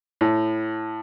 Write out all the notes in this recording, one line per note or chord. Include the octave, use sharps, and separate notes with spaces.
A2